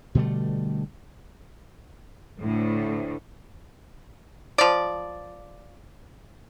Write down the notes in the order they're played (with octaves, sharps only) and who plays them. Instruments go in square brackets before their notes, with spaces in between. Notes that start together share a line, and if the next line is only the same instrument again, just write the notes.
[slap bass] B2 D3 G3 A3
[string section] D2 A2
[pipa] F3 D5